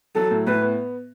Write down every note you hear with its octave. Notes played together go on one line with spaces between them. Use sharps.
F#3 A4
A2
A2 B4
B3